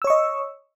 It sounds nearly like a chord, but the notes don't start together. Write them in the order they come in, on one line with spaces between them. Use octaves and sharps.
E6 C#5 C#6 D#5